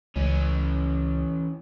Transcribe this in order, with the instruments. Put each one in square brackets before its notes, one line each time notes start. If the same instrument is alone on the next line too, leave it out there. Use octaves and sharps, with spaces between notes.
[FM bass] C#2 [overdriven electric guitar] E3 C#4